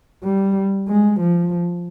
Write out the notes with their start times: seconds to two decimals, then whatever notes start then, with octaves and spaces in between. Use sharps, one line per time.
0.24 G3
0.88 G#3
1.20 F3